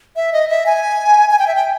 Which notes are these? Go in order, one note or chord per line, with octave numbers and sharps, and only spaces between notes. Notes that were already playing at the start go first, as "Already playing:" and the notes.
E5
D#5
E5
G#5
G#5
G5
E5
G5